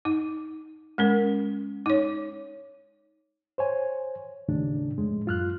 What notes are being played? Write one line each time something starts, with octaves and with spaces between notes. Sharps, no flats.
D#4
G#3 C#4 A#4
D#4 C#5
C5 C#5 G#5
D#2 A2 C#3 D4
F2 A2 G#3
F#2 F4 F6 F#6